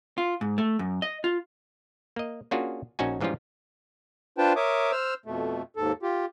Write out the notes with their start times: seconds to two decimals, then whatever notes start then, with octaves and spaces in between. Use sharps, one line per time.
0.18 F4
0.41 G#2
0.58 A3
0.79 F#2
1.02 D#5
1.24 F4
2.16 A#3 D#5
2.51 A#3 C#4 D4 F4 F#4 G#4
2.99 A#1 C#4 D#4 F#4 G#5
3.21 G#2 E3 F3 G3 C#4 F4
4.38 D4 F4 B4 C5 G5 A5
4.56 A#4 C#5 E5 D6 D#6
4.92 C5 E6 F6
5.26 F2 B2 A3
5.76 D#2 G#2 A4
6.03 F4 G4